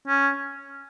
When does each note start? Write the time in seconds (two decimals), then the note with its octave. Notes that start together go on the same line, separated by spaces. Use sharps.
0.07 C#4